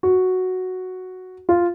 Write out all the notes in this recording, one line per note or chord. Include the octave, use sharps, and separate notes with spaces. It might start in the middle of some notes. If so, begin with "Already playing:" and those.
F#4
F4